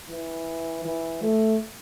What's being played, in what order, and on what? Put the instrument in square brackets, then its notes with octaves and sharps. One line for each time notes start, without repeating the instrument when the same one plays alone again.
[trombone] E3
E3
A3